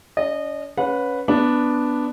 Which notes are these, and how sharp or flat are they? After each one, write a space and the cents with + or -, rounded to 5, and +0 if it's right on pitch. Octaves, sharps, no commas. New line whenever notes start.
C#4 +45 D#5 -25
C#4 +0 B4 +0 F#5 -35
B3 +0 D4 +0